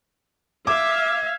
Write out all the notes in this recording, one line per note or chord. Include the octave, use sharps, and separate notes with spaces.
E5 F5 D6 G#6